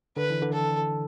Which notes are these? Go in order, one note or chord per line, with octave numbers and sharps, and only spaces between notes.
D3 B4
E3
D3
A4